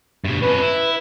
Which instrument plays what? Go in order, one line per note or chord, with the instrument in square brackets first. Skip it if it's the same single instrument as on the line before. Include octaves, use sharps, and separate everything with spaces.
[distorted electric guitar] G2 B2
[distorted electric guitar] F2 C#4 [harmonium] B4
[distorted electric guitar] E4